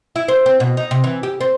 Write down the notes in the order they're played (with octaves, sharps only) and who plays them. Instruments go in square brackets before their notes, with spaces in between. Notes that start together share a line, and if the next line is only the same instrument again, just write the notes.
[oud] E4
C5
C4
B2
D#4
C3
E3
G4
C4